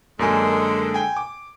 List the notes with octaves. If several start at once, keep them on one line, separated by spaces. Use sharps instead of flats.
F#2 D3 G#3 A#3 G#5
G5 G#5
D6